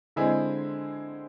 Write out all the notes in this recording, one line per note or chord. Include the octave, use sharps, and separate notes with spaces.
D3 G#3 C4 E4 G#4